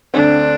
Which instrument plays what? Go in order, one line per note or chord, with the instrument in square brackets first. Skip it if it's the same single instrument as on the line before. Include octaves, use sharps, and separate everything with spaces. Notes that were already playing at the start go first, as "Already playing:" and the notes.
[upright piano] D2 D3 C4 [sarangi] D4